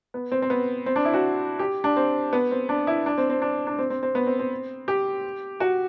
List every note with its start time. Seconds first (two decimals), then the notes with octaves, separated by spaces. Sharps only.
0.14 B3
0.32 C4
0.42 C4
0.50 B3
0.86 C4
0.96 D4
1.05 E4
1.14 F#4
1.59 G4
1.84 D4
1.96 C4
2.33 B3
2.51 C4
2.69 D4
2.87 E4
3.06 D4
3.18 C4
3.30 C4
3.42 D4
3.67 D4
3.79 C4
3.90 C4
4.03 C4
4.15 B3
4.27 C4
4.39 C4
4.88 G4
5.60 F#4